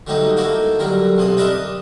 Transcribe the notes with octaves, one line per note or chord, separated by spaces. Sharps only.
D3 F#3 G3 A3 D#4
A#3 D#4 E4 F#4 A4
D3 F#3 G3 A#4
B1 C3 B3 D#6
D4 A#4 B4 D#5 E5 A5
D#6